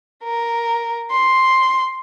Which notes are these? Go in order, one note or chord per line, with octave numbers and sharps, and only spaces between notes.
A#4
C6